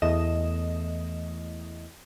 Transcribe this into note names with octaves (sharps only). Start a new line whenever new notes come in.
E2 A3 D#5 E7